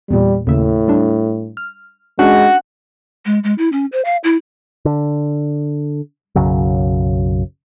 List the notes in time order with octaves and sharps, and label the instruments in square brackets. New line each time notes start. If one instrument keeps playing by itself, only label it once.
[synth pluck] E2 A#2 [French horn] G3
[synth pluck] D#2 C#3 E5 [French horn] A2
[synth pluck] G3 D4
F6
[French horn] G#3 [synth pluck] C#4 D4 [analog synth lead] F#4
[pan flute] G#3
G#3
E4
C#4
C5
F5
E4
[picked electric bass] D3
B1 F#2 C#3 F#3